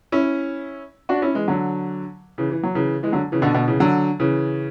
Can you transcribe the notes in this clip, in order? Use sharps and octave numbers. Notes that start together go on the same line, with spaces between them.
C#4 E4
D4 F#4
C#4 E4
E3 G#3
D3 F#3
C#3 E3
E3
F#3
C#3 E3
E3 G#3
D3 F#3
C#3 E3
B2 D3
B2 D3
C#3 E3
D3 F#3
C#3 E3